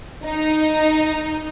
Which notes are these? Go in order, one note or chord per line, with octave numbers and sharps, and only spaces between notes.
D#4